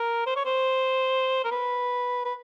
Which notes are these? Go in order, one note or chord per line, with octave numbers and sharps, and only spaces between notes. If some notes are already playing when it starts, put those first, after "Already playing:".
Already playing: A#4
C5
C#5
C5
A#4
B4
B4